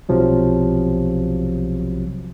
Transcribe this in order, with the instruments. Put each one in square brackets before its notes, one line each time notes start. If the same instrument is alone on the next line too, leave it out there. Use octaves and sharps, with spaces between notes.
[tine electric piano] B1 C3 F3 F#3